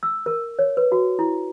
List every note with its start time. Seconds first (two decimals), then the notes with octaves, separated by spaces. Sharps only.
0.03 E6
0.26 A#4
0.59 C#5
0.77 B4
0.92 F#4
1.19 E4